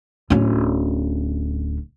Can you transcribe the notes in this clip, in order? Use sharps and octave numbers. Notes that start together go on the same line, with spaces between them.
D1 C#4